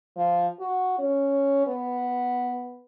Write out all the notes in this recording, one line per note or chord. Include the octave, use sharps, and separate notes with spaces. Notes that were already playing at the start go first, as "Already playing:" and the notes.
F3
F#4
C#4
B3